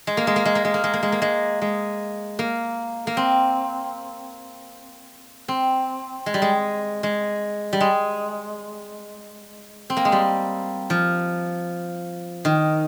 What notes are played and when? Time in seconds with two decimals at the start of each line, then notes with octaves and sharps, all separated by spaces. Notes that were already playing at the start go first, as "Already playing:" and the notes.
0.07 G#3
0.17 A#3
0.27 G#3
0.36 A#3
0.45 G#3
0.55 A#3
0.65 G#3
0.74 A#3
0.84 G#3
0.94 A#3
1.03 G#3
1.12 A#3
1.22 G#3
1.62 G#3
2.39 A#3
3.07 A#3
3.17 C4
5.48 C4
6.26 G#3
6.34 G3
6.42 G#3
7.03 G#3
7.73 G3
7.80 G#3
9.90 C4
9.97 A#3
10.05 G#3
10.12 G3
10.90 F3
12.45 D#3